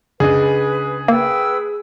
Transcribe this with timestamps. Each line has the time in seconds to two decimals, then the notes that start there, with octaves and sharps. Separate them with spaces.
0.20 C#2 D4 G#4 B4 D#5
1.08 A#3 B4 G5 E6